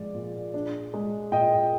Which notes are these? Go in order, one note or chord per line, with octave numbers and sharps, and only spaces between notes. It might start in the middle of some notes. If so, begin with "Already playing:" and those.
Already playing: F3 G#3 D5
A#2
D4
G#3
A#2 D#5 G5